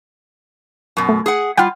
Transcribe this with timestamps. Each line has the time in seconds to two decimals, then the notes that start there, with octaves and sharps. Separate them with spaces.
0.97 F#2 B2
1.09 A3
1.26 G#4 F#5
1.57 G3 F4 F#5 G5 F6